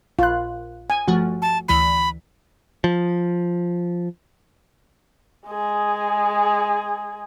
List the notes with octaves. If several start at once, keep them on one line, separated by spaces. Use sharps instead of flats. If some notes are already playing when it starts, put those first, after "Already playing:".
A#1 F4 F#6
G#5
G1 F3 A3 F#4
A5
D2 E3 B5 B6
F3
G#3 G#4